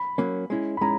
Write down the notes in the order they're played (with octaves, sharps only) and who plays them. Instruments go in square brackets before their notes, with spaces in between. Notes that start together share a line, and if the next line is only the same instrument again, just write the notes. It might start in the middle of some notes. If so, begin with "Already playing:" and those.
Already playing: [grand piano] B5
[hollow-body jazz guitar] F#3 A#3 C#4
G#3 C#4 E4
[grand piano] B5
[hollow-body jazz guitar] G#3 C#4 E4 [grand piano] A#5